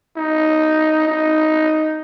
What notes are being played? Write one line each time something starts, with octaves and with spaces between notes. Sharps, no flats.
D#4
D#4